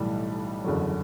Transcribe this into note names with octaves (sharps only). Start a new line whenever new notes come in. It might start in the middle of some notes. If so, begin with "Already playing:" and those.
Already playing: B1 A2 E3 G3
F#1 E2 D3 F#3